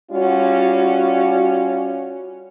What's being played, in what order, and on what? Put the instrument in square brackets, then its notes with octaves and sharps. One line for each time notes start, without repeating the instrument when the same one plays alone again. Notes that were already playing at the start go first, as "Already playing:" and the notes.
[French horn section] G3 C#4 F4 F#4